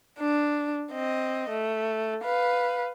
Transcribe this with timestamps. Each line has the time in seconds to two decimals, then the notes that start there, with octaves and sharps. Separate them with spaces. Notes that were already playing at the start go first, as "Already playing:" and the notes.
0.19 D4
0.92 C4 D#5
1.50 A3
2.24 B4 F5